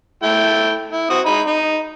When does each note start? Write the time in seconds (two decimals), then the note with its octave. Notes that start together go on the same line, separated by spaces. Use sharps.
0.23 A3 E4 G5
0.92 E4
1.10 C4 F#4 D#6
1.26 G#3 D#4 B5
1.47 D#4